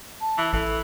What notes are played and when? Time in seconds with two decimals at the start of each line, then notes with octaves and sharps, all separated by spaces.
0.21 A5
0.38 E3
0.53 A1 E3 A4